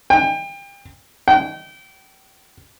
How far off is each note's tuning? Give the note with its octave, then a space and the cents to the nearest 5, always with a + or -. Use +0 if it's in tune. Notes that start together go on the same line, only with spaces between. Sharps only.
G5 +30
G5 -30